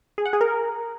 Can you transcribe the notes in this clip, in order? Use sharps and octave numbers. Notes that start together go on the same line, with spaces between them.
G#4
F#5
G#4
A#4